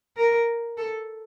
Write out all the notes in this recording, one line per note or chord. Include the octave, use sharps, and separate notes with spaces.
A#4
A4